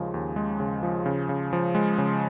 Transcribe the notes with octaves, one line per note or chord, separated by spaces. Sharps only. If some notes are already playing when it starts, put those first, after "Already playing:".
Already playing: D#2 C#3 F3 G#3
D#2
G#3
C#3
F3
C#3
C#3
F3
G#3
C#3